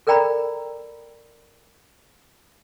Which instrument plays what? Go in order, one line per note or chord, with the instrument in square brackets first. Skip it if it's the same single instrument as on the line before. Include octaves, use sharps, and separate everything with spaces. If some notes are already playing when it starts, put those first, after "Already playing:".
[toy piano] A4 A#4 D5 G5 A#5 B5